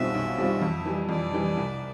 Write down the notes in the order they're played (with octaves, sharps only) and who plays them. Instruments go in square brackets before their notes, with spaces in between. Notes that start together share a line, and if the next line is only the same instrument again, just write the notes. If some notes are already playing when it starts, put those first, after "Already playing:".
Already playing: [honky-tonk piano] B1 B2 G3 C4 F4 [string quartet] E5
[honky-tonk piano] B1
B2 G3 C4 F4
F2
E3 G3
[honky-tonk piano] F2 [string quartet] D5
[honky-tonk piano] E3 G3
C2